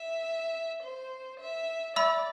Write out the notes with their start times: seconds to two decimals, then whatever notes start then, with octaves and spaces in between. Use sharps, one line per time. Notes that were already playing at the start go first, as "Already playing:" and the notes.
Already playing: E5
0.83 C5
1.40 E5
1.96 D5 E5 B5 E6